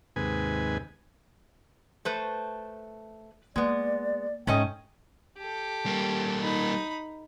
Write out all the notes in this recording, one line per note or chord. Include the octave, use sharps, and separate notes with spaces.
D#2 G#2 C3 B4 G#5
A3 B4 C5
G#3 A#3 B3 D5
G#2 A3 C#4 D#5 G5
G4 A4
G3 A#3
D#4 B5